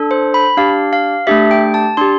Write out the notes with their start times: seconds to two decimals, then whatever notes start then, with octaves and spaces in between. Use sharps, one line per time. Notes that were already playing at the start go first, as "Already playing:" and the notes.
Already playing: D4 A4
0.11 C5
0.34 B5
0.57 D4 G4 F5
0.93 F5
1.27 A3 D4 G4 E5
1.51 G5
1.74 A5
1.97 D4 G4 C6